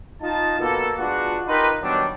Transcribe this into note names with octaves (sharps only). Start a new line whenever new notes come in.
D#4 F4 A5
B2 A#3 A4
G#3 B3 D4 F4 F#4
D#4 F4 G4 A#4 B4
D#3 F#3 G3 B3 D4